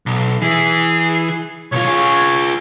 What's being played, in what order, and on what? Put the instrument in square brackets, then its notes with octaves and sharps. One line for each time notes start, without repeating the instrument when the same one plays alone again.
[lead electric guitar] B1
[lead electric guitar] E3 E4 [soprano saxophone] G#4
[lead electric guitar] B1 F4 [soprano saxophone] C#5
[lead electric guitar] F4 G#4